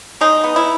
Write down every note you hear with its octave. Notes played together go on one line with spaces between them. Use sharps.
G#3 D#4
B3
E4